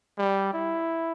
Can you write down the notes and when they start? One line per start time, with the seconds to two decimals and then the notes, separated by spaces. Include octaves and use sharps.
0.18 G3
0.53 E4